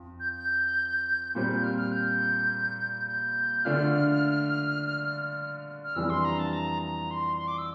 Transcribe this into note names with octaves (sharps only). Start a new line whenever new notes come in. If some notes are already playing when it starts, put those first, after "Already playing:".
Already playing: F2
G6
G6
A#2 G3 C4 G6
G6
F6
F6
G6
G6
D3 A3 D4 F4 F6
F6
F2 E3 G3 D4 F4 E6
C6
A#5
A5
A#5
A#5
C6
C6
D6
E6